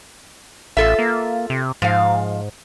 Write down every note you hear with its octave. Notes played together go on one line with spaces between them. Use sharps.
A1 F4 A4 E5
A#3
C3
G#2 F3 F5